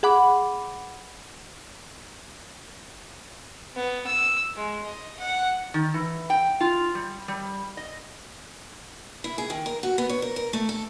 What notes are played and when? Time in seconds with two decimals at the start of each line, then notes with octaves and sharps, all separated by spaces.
0.03 G#4 F#5 B5 D6
3.76 B3
4.06 E6
4.55 G#3
4.86 D#5
5.20 F#5
5.74 D#3
5.94 E3
6.30 G5
6.61 F4
6.95 G3
7.28 G3
7.77 D#5
9.24 E4
9.38 G#4
9.50 D#3
9.66 A#4
9.83 F#4
9.98 B3
10.09 C#5
10.22 A#4
10.36 A#4
10.53 A3
10.69 A4